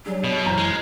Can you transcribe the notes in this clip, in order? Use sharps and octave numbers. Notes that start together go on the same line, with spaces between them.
F#3 G3 D4 G#4
B2 D#5 B5
F#2 E3 C5 A#5 F6
G#3